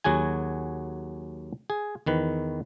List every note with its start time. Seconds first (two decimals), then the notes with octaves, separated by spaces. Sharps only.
0.04 D#2 F#3 F#4 G#4 G#5
1.70 G#4
2.06 E2 D#3 B4